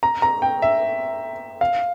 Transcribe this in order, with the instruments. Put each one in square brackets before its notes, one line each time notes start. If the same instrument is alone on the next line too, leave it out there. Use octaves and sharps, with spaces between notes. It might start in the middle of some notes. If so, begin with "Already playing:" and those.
[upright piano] A#5
A#5
G5
E5
F5